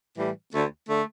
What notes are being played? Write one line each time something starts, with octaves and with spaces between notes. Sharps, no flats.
A2 E3 G3
D2 D3 A3
D3 A3